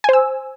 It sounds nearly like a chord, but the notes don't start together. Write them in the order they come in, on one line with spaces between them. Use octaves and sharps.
G#5 C5 E6